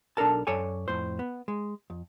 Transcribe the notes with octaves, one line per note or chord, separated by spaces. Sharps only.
B1 D4 A4 A#4 A5
F#2 A4 C#5 D5 G#5
F2 A2 C5
B3
G#3
F2